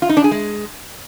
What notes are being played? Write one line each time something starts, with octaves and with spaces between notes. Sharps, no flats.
F4
D#4
D4
G#4
G#3